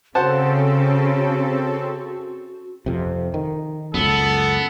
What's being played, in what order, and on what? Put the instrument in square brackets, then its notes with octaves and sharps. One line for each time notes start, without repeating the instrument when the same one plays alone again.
[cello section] C#3 [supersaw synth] C4 A4 [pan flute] F#4 [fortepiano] C5 F#5 A5
[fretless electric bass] F2 C3
D#3
[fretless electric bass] C#2 F#2 [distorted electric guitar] B3 [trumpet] A4